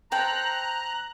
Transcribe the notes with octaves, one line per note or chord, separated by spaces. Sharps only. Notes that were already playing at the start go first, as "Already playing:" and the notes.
A4 C5 G5 A#5 F#6